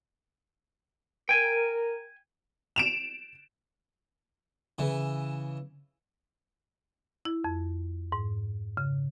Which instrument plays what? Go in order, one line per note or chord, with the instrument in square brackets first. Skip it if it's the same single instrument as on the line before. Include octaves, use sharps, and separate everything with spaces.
[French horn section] A#4 [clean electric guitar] G5 G#5
[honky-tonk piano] D7 E7 F7
[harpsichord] C#3 E3
[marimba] E4
F2
G#2
C#3